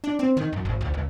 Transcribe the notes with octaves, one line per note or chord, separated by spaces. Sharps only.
D4
C4
D#3
F#2
G#1
D2
C#2